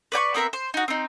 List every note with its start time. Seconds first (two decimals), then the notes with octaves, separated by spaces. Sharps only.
0.12 B4 D5 G5 C#6
0.34 B3 C4 A#4 E5
0.53 C5
0.74 D#4 F#4
0.88 C4 D#4